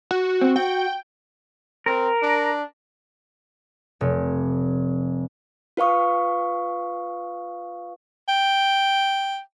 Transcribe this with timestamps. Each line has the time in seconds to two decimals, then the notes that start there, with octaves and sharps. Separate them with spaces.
0.11 F#4
0.41 C4
0.56 F#4 G5
1.86 C4 A#4
2.22 D4
4.01 F1
5.77 F4 B4 F5 C#6 D#6
8.28 G5